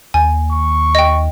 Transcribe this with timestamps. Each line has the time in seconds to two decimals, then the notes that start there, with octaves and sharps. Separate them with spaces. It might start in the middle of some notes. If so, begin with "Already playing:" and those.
0.14 D#2 G#5
0.52 C#6
0.95 D#5 G5